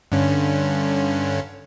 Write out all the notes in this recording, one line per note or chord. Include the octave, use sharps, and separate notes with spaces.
G2 D3 C#4